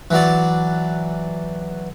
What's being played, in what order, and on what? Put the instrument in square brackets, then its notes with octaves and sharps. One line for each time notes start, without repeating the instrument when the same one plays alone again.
[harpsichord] E3 F#3 D5